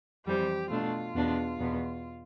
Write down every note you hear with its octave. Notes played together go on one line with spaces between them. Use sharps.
F2 E3 G3 C4 G4
B2 A3 D4 F4
E2 B2 B3 D4
E2 B2 B3